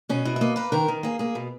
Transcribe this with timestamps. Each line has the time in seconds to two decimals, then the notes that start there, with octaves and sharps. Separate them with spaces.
0.09 B2 C#4
0.25 B2 E4
0.36 E5
0.41 A#3 D#5
0.56 A#3 B4
0.72 D#3 A#4
0.88 D#3
1.03 A#3 G#4
1.19 A#3 G#4
1.35 B2